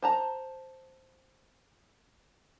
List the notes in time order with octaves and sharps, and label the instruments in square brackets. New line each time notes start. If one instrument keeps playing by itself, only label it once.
[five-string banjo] C5 A5 A#5